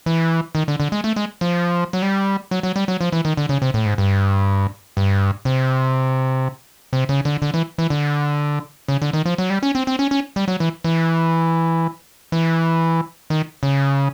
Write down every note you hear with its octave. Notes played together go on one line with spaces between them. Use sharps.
E3
D#3
D3
D3
G#3
A3
G#3
F3
F#3
G3
F#3
F#3
G3
F#3
F3
E3
D#3
D3
C#3
C3
A2
G#2
G2
G2
C3
C3
C#3
D3
D3
E3
E3
D3
C#3
D3
D#3
F3
F#3
G3
C#4
C4
C4
C#4
C#4
G3
F#3
E3
E3
E3
D#3
C#3